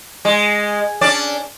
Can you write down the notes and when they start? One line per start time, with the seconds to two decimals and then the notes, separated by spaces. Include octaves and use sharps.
0.25 G#3
1.01 C#4 D4 D5